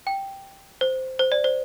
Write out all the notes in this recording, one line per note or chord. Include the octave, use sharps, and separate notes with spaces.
G5
C5
C5
D5
C5